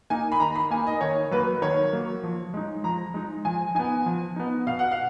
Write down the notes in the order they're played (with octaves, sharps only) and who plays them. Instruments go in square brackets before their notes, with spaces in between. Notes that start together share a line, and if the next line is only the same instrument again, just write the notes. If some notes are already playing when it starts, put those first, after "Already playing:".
[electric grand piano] A#3 D#4 [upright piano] G#5
[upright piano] B5
[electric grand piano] D#3 [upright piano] A#5
[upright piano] B5
[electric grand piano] A#3 D#4 [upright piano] G#5
[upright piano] D#5
[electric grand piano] D#3 [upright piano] C#5
[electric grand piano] F#3 A#3 [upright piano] B4
[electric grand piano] D#3 [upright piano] C#5
[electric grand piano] F#3 A#3
F3
G#3 D#4
[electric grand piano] F3 [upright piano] A#5
[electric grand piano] G#3 D#4
[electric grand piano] F3 [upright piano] G#5
[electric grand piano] B3 D#4 [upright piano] G#5
[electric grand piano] F3
B3 D#4
[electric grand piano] B2 [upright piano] F5
[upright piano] F#5
F5